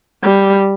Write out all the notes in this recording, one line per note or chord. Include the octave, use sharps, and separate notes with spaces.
G3